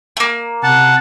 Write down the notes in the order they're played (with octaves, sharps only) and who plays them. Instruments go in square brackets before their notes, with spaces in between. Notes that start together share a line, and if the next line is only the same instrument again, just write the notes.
[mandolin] A3 A#3
[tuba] C3 [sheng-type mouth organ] F#5 A5